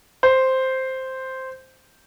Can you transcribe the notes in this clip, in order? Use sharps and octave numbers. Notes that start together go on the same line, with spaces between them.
C5